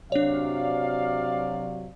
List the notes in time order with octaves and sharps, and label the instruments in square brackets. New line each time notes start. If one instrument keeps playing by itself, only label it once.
[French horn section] C3 F#3 [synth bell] D4 C#5 [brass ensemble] D5 F5